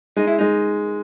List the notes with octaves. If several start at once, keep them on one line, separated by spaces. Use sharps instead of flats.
G#3 D#4
E4
G#3 D#4